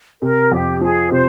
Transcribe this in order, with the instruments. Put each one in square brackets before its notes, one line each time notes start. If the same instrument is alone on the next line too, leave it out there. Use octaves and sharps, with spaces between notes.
[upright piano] C3 [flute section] A#4
[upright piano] F2 [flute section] G4
[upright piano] F3 [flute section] G#4
[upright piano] C3 [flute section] C5